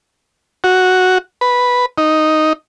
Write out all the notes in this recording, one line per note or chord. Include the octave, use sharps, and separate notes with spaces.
F#4
B4
D#4